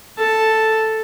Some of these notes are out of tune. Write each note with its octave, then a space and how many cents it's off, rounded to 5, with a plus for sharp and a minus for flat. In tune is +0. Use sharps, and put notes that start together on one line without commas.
A4 +0 A5 +0